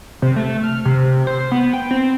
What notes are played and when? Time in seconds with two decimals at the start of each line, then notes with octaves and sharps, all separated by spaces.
0.22 C3
0.36 A3
0.63 F6
0.85 C3
1.27 C5
1.52 B3
1.73 G5
1.91 C4